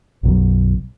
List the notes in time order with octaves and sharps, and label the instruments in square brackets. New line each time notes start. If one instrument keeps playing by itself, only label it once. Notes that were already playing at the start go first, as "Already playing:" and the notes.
[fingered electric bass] B1 F#2 B2 F#3